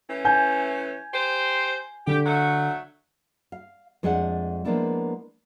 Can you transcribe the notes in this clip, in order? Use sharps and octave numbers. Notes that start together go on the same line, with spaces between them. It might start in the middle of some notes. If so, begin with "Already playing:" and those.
E3 A3 C#4
G#5 G6
G4 C5
D3 G4
F#3 A3 F#4
F5
F2 G#3 A3 D4 G4 F#5
F3 G#3 A#3 B3 D4 E4